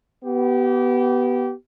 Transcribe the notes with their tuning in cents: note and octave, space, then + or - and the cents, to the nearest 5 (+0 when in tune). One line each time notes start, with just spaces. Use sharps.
B3 -5 G4 -25